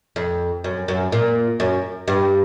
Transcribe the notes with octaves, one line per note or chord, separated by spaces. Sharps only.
F2
F#2
F#2
A#2
F#2
G2